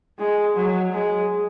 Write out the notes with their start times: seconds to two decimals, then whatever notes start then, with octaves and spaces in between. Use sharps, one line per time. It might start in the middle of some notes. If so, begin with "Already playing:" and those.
0.19 G#3
0.55 F#3
0.92 G#3